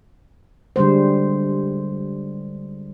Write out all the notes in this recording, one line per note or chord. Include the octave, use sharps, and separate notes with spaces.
D3 G3 G#3 C5